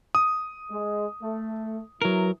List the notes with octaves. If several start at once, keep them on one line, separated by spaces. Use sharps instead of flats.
D#6
G#3
A3
E3 F#3 A#4